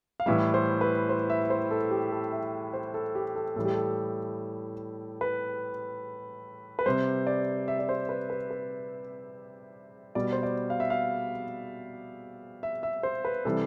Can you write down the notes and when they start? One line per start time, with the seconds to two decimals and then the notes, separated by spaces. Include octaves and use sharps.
0.20 F5
0.26 A2 E3 G3 E5
0.54 C5
0.81 B4
1.09 C5
1.30 E5
1.50 C5
1.71 A4
1.91 G4
2.12 A4
2.32 E5
2.74 C5
2.94 A4
3.15 G4
3.36 A4
3.56 A2 E3 G3 A4
3.65 G4
3.74 A4
5.21 B4
6.79 B4
6.86 C3 G3 C5
7.27 D5
7.68 E5
7.79 D5
7.89 C5
8.09 B4
8.30 B4
8.51 B4
10.15 B2 G3 D5
10.33 C5
10.43 D5
10.70 F5
10.80 E5
10.90 F5
12.63 E5
12.83 E5
13.03 C5
13.25 B4
13.45 C3 E3 G3 A4